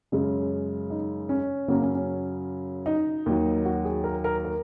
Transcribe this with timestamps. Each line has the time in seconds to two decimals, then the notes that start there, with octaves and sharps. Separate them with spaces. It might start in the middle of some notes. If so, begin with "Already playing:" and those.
0.12 F#2 C#3 G#3 C#4
0.90 D#4
1.29 C#4
1.68 F#2 C#3 F#3 A#3
1.82 C#4
1.95 C#4
2.86 D#4
3.26 D#2 D#3 F#3
3.65 F#4
3.85 G#4
4.04 A#4
4.24 A#4
4.45 A#4